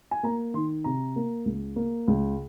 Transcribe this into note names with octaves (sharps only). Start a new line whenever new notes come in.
G#5
A#3 A#5
D#3 C6
C3 A#5
A#3
C#2
A#3
C#2